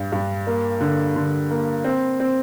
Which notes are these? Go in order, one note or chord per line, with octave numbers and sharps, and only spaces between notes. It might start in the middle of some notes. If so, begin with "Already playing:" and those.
Already playing: G2 D4
G2
A#3
D3
D3
A#3
C4
C4